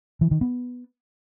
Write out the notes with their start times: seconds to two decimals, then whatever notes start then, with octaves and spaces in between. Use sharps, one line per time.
0.21 E3
0.31 D#3
0.41 B3